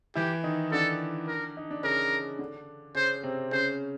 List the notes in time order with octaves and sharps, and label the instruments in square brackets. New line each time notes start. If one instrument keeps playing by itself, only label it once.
[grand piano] E3 E4 [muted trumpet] G4
[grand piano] D#3 D#4
[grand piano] D3 D4 [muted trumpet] A4
[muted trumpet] A#4
[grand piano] D#4
D4
[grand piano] C#3 C#4 [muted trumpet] A#4
[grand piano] D3 D4
[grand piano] C#3 C#4 [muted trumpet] C5
[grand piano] C3 C4
[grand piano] C#3 C#4 [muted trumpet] C5